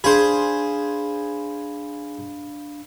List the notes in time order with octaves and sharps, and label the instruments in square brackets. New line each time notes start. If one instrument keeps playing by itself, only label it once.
[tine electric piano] D4 F5 B5 [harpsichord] G#4 C5